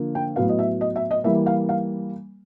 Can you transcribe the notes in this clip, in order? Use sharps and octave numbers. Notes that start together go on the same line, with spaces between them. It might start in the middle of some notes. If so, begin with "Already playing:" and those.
Already playing: D3 F3 A#3
G5
A2 F#3 B3 F5
D#5
E5
D#5
E5
D#5
E3 G3 A#3 E5
F5
F5